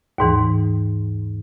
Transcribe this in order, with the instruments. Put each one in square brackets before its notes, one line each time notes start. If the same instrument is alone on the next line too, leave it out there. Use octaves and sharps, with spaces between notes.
[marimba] D#2 G#2 E3